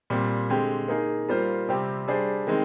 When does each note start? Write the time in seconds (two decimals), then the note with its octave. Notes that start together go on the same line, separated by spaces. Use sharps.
0.10 A#2 G3 C4
0.50 D3 G#3 C4 G4
0.88 A#3 D#4 G#4
1.28 G3 A#3 F4 C5
1.69 C3 G3 C4 G4
2.08 G3 D4 G#4 C5
2.47 D#3 G#3 C4